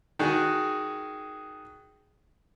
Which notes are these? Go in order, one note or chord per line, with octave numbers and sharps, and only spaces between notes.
D#3 F#4 G#4